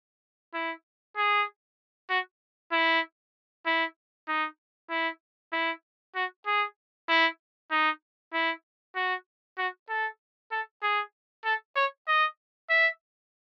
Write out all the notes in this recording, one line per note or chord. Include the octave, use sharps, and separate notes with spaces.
E4
G#4
F#4
E4
E4
D#4
E4
E4
F#4
G#4
E4
D#4
E4
F#4
F#4
A4
A4
G#4
A4
C#5
D#5
E5